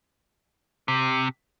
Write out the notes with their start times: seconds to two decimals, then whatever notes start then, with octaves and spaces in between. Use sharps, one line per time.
0.88 C3